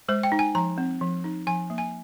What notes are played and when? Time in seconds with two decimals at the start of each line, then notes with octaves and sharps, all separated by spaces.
0.09 G#3 C5
0.23 G5
0.32 D#4
0.39 G#5
0.55 F3 A#5
0.78 C4
1.01 F3
1.24 D#4
1.47 F3 G#5
1.70 A#3
1.78 G#5